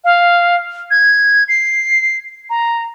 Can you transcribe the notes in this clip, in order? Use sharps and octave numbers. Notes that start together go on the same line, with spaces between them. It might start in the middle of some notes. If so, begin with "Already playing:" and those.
F5
G#6
C7
A#5